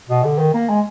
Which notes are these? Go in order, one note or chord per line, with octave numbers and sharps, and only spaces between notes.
B2
D3
D#3
A#3
G#3